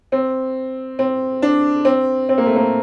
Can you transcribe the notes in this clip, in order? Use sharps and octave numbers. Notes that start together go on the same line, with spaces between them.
C4
C4
D4
C4
C4
A#3
A3
A#3